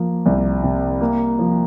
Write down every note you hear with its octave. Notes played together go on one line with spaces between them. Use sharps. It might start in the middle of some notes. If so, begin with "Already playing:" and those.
Already playing: F3 A#3
C2
C3
A#3
F3